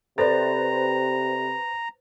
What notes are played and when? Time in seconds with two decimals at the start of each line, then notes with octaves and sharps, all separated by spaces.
0.18 C3 A4 B4 C5 D5 A#5 A6